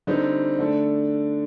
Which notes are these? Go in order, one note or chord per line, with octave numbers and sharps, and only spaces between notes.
D3 G3 C4 D#4
D3 A3 D4